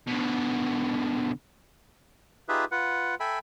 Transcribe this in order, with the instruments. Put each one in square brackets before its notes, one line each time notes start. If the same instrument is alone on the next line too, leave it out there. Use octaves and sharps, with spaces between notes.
[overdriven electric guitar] B2 D3
[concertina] D#4 F4 G4 G#4 B4 E5
F4 B4 F#5
A4 E5 G5 G#5 B5